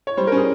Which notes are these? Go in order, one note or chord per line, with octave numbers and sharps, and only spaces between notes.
C#5
G3 C5
C#4 A#4
G#4